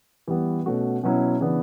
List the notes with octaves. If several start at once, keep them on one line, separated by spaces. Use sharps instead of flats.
E3 G3 B3
B2 A3 C#4 F#4
B2 F#3 C#4 E4
C#3 E3 B3 D4